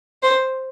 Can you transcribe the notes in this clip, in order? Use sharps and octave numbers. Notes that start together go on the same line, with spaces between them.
C5